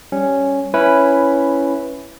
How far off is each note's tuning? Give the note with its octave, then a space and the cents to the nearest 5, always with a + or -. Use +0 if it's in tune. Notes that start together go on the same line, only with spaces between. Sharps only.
G3 +0 C#4 +0
C#4 +0 E4 +5 B4 +0